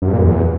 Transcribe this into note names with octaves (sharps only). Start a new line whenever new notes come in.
F#2
G2
A#2
F#2
E2